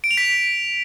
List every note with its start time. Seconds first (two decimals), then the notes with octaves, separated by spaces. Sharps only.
0.04 D7
0.11 F7
0.17 B6